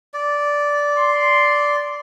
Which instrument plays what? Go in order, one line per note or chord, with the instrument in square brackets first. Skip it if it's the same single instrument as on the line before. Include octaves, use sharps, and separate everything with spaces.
[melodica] D5
[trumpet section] C6